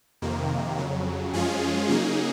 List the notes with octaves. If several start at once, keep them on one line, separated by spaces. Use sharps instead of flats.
F2 C3 D#3 A#3
F2 C#3 F#3
F#2 F3 G#3 C#4 F4 G#4
C#3 F#3 A#3 D#4 G#4